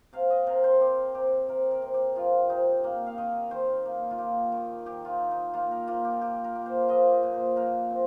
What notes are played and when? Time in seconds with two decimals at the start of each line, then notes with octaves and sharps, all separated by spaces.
0.13 C3 F5
0.30 D#5
0.47 C3 A#4
0.64 C5
0.81 C4 G4
1.15 C3 G4
1.49 C3 A#4
1.71 A#4
1.82 C3
1.94 G4
2.15 F3 F4
2.49 C3 D#4
2.84 A#3
3.06 F5
3.18 D#3 D#5
3.51 D#3 C5
3.86 A#3
4.11 F4
4.18 A#3 G4
4.52 D#3
4.86 D#3 G4
5.05 D#4 F4
5.20 D#3
5.31 D#4
5.54 A#3 F4
5.71 A#4
5.87 A#3 F4
6.05 G4
6.21 A#2 G4
6.44 A#4
6.55 A#3
6.66 C5
6.88 F3 D#5
7.11 D#5
7.23 A#2
7.34 C5
7.56 A#2 A#4
7.90 C4